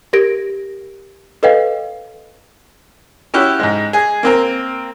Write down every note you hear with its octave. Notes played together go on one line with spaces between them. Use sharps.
G4 A#4 G#6 A#6 D7
A4 B4 C#5 D#5 F5 G5
C#4 E4 F#4 G4
G#2 G#3
G#4
A#3 C4 A#4